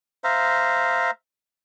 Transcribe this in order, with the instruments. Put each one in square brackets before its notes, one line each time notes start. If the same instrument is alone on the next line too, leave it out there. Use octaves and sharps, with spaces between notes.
[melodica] C5 E5 F5 A#5